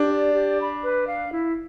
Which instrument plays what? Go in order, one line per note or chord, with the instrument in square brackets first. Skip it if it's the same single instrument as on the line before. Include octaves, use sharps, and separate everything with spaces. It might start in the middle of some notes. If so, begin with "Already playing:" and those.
Already playing: [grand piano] D4 [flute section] G4
[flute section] D5
G4
B5
B4
F5
E4